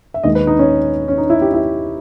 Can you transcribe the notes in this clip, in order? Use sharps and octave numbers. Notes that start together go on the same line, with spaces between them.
E5
D#2 D#3 G#3 D#5
B4
D#4
C#4
C#4
D#4
E4
G4
E4